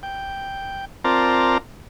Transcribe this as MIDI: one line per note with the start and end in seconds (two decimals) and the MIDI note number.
0.03 0.85 79
1.04 1.58 60
1.04 1.58 65
1.04 1.58 70
1.04 1.58 74
1.04 1.58 81
1.04 1.58 82